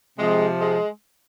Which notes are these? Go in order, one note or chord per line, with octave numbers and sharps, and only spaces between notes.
C3 F3 G#3
G#3